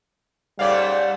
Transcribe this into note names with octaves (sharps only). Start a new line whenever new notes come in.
G#2 G3 A3 C#4 D5 F5